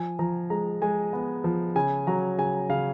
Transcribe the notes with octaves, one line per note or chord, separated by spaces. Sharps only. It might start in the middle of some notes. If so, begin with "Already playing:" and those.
Already playing: F3 G#5
F3 A#5
G#3 A#5
G#3 G#5
B3
F3
C#3 G#5
F#3 A#5
C#3 G#5
C#3 F5